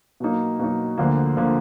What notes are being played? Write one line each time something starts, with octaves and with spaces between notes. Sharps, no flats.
B2 F#3 A#3 D#4
B2 F#3 A#3 D#4
D2 D3 F3 A#3
D3 F3 A#3